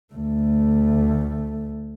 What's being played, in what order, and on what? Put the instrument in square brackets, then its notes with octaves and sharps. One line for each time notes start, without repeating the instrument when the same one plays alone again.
[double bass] D2 A3